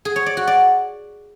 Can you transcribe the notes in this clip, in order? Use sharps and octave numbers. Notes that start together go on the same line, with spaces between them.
G#4
C#5
D5
F#4
D5